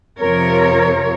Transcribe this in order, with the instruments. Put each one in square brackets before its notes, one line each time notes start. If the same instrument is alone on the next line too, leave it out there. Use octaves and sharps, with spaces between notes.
[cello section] F2 C3 F3 A#4 C#5